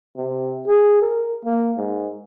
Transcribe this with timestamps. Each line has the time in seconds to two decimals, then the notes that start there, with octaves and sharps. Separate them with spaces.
0.16 C3
0.67 G#4
1.02 A#4
1.45 A#3
1.77 G#2